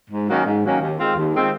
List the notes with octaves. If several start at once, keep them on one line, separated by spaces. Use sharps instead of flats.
G#2
D#3 F#3 A#3 C#4
G#2
D#3 F#3 A#3 C#4
D#2
D#3 G#3 C4 F4
D#2
D#3 G#3 C4 F4